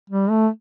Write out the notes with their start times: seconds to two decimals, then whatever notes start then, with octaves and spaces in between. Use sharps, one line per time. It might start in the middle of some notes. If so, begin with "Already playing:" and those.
0.10 G3
0.30 A3